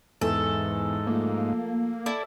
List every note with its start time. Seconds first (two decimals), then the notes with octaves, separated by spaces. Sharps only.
0.21 E2 G#2 A4
1.07 F3 A3 A#3
2.06 E4 A4 D5